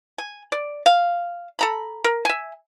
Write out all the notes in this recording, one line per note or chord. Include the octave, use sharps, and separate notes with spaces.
G#5
D5
F5
A4 A#5 B5
A#4
E5 G#5